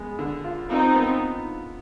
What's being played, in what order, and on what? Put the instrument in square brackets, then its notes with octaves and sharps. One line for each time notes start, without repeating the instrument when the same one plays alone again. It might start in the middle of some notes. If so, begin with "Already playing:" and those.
Already playing: [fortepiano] G#3 B3
D3
F4
[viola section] C4 D#4 [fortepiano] F4
[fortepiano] B3